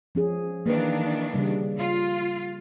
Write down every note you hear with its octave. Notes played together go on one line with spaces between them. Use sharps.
F3 C#4 G#4
D#3 E3 A#3 D4 B4
C#3 G3
F4